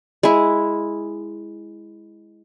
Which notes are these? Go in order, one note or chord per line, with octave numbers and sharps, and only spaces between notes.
G#3 E4